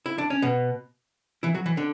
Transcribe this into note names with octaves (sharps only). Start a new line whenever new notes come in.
E4
D4
C#4
B2 B3
E3 E4
F#3 F#4
E3 E4
D3 D4